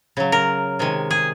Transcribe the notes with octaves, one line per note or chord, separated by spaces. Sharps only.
C#3 F#3
A#4
C3 D#3 G#3
G#4